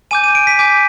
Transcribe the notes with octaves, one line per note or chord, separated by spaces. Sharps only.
G#5 D6 G6 D#7
D#7
D7
B6
G#5 D6 G6